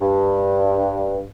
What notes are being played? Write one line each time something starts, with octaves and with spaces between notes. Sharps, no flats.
G2